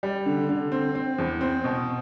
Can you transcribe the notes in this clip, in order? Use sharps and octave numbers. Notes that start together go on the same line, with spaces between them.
G3
D3
D3
C4
C4
E2
C4
B2